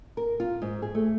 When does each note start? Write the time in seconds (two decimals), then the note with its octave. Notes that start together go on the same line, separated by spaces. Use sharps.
0.17 A#4
0.40 F4
0.62 G#2
0.82 G#4
0.95 A3